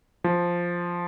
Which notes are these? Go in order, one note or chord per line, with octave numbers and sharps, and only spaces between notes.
F3